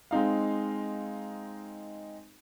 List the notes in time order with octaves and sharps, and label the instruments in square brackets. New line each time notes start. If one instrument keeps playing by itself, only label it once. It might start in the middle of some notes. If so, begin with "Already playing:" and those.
[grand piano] G#3 C4 D#4 F5